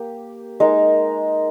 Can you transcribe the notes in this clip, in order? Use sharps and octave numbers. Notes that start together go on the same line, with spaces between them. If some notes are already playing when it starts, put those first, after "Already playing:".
Already playing: A#3 G4
G#3 D#4 A#4